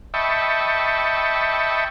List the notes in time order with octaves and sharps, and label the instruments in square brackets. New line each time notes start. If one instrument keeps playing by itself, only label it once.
[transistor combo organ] D#5 E5 G5 A5 B5 C#6